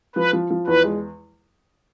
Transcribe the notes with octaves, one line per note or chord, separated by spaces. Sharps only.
F3 B4
F3
F3
E2 B4
G#3